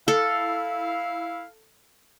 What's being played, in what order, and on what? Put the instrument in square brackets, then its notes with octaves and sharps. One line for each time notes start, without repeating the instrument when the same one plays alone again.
[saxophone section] E4 F5 [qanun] A4